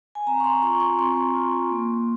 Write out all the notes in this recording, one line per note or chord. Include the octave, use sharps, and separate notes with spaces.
G#5
C4 A#5
C#6
C6
F4 C#6
C#6
C4 C6
F4
A#3